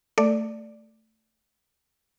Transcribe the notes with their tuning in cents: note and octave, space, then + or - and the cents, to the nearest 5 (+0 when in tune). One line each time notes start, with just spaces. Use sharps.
A3 +10 D5 +0